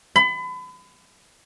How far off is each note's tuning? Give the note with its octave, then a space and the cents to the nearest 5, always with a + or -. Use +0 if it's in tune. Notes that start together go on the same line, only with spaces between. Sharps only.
B5 +35